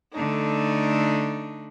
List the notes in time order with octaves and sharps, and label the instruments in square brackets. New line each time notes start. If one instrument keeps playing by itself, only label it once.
[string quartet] D3 A3 D4 D#4